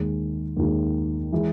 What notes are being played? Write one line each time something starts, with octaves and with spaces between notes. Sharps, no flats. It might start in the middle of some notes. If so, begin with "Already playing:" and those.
Already playing: D#2 D#3 G#3
D#2 D#3 G#3
E3 G#3